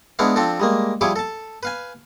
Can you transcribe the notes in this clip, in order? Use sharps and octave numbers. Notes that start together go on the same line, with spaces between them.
G#3 B3 D4 E4 C#5 F5
F3 C4 D4 A4
G3 G#3 A#3
F3 G3 E4 G#4 C#5 D6
A4 A5
B4 F5 G#5